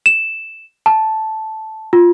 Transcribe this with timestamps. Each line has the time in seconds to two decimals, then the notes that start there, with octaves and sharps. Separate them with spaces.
0.06 E7
0.86 A5
1.93 F4